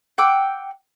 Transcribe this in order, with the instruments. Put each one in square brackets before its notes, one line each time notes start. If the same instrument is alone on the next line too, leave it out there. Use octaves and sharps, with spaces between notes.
[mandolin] F#5 G5 D6 E6